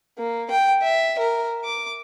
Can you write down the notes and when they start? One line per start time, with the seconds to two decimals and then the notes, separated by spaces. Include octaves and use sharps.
0.18 A#3
0.51 G5
0.83 E5
1.18 A#4
1.64 D6